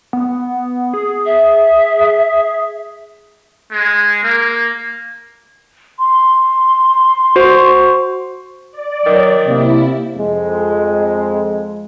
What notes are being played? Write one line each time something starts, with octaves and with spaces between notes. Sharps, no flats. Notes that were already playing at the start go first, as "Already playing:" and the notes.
B3
G#4
E5
G#3
A#3
C6
F#4 C5
D5
D#3 F#3
C3 A#3 E4
F2 G#3